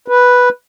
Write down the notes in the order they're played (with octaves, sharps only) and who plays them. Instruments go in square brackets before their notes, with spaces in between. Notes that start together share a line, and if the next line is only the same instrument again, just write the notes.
[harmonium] B4